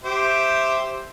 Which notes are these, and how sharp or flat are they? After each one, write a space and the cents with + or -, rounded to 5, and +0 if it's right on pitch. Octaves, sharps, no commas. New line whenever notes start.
G4 +0 C5 +0 E5 +0